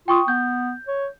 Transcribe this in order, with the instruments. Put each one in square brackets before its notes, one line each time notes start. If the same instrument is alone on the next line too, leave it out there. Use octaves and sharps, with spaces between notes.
[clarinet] F4 [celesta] G5 C#6 D#6
[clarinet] B3 [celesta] G6
[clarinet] C#5